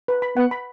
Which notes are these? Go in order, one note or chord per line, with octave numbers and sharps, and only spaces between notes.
B4
B5
B3 F#5
B5